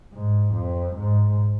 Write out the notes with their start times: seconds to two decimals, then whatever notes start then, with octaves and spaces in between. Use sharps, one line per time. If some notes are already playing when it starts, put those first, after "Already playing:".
0.13 G#2
0.55 F2
0.96 G#2